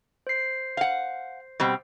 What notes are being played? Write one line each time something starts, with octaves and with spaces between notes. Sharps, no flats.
C5 C7
F5 F#5
B2 G3 C4